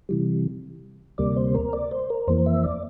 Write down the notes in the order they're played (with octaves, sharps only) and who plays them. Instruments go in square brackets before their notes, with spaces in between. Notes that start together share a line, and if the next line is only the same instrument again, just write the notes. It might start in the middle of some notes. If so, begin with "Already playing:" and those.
[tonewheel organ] C3 E3 G3
D2 C3 G3 A#3 D5
C5
A#4
D5
C5
A#4
F2 E3 A#3 C5
E5
D5